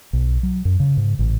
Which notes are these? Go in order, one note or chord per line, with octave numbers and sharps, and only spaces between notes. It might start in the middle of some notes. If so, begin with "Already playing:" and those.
B1
F#3
F#2
C#3
G#2
A1